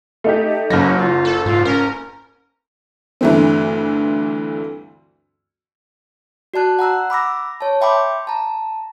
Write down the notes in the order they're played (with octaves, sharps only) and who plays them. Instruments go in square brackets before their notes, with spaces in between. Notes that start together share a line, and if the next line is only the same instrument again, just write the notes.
[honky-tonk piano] A3 D#4 G4
[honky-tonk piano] F#1 A#6 [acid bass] F#3 [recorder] C#4
[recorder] F4
[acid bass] A4
[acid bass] G#2 [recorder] F4
[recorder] C#4 [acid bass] A#4
[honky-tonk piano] D2 G2 E3 A3 C4
[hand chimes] F#4 D5 A5 F#6
F#5 A#5 E6 F#6
B5 D6 E6 A#6
C#5 A5
E5 G5 B5 C6 D6
A5 A#5